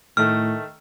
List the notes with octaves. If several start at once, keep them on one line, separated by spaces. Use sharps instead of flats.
A2 D#3 A3 F6